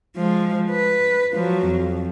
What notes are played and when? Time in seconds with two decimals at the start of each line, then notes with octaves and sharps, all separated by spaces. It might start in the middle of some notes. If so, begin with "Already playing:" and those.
0.16 F3 G#3
0.71 B4
1.34 F3 F#3
1.67 F2